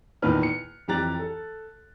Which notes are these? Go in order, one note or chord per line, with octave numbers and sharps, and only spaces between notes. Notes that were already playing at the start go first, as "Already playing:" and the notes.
E2 A#2 D#3 D#4 B4 F6
C#7
F2 E3 G4 A#5 F#6 A6
A4